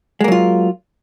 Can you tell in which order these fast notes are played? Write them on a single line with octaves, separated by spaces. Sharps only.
G#3 A#3 F#3 F4